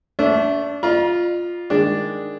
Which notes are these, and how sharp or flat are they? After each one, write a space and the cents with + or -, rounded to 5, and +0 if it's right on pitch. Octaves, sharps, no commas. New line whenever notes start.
A3 +0 D4 -30 A4 +0
F4 +0 D5 +45 A#5 +40
D#3 -5 G#3 +0 D4 +0